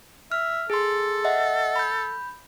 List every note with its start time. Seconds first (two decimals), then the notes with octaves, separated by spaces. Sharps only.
0.32 E5 F6
0.70 G#4 A4 C6
1.25 D#5 E5 F#5
1.76 B5 G6